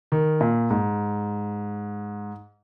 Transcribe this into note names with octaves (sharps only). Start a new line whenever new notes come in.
D#3
A#2
G#2